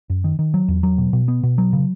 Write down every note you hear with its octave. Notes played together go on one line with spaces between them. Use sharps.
F#2
D#3
D#3
F#3
E2
F#3
B2
B2
B3
B2
F#3
C#3